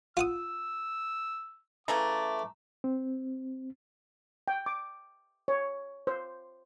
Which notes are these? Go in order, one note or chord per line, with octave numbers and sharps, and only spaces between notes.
F4 F#5 D#6 E6
C#3 E3 A3 A#5 D6
C4
G5
D6
C#5
C5